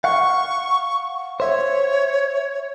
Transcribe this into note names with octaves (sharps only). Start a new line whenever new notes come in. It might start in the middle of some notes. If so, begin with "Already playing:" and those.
F5 F#5 C#6
C5 C#5 E5